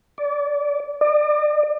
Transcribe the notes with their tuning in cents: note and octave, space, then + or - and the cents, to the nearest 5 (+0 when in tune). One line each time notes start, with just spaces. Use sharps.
D5 -25
D5 +40